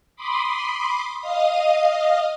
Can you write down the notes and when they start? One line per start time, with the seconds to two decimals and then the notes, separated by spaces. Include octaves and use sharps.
0.16 B5 C6 D6 D#6
1.20 D#5 F5 D#6